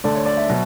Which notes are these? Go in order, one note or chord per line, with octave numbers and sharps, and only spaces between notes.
D2 D3 A3 D5
C#5
D5
E5
B2 F#3